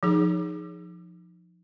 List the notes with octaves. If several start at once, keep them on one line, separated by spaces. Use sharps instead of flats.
F3 D#4 G#4